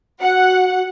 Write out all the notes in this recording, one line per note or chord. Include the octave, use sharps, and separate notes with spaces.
F#4 F#5